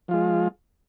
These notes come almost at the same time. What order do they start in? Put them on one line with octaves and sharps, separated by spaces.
F3 F4 G#3